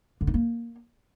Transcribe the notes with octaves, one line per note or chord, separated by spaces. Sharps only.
D3
D#4
A#3